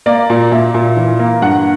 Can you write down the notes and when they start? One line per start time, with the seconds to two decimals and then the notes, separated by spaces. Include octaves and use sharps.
0.06 A#3 D5
0.30 A#2
0.52 A#2 E5
0.74 A#2
0.97 E3
1.19 A#3
1.42 G2 F#5